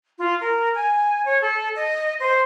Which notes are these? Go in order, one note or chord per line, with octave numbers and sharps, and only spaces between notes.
F4
A#4
G#5
C#5
A4
D#5
C5